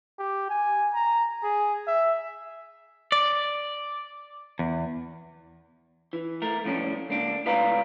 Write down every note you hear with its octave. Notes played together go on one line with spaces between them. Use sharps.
G4
G#5
A#5
G#4
E5
D5
E2
E3
A3 A#4
C2 F2 A2 C#4 D4
C#2 A#3 D4
C#2 A2 B4 D5 F5 A#5